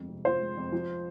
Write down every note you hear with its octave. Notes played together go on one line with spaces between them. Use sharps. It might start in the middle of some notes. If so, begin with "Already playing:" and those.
Already playing: G1 F2 G#3
C3
F3 C5
G#3
F2
F3